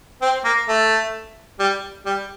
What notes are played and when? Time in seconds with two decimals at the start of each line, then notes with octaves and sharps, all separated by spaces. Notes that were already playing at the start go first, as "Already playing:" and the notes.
0.22 C4
0.45 A#3
0.68 A3
1.59 G3
2.06 G3